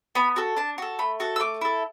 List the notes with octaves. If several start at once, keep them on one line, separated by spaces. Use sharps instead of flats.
B3 B5
F#4 A4
D4 A5
F#4 A4
A3 B5
F#4 A4
E6
A3 D6
E4 A4